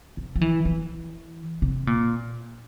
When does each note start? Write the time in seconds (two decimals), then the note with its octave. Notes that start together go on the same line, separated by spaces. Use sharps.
0.17 C3
0.36 F3
0.41 E3
0.65 E3
1.62 C3
1.87 A#2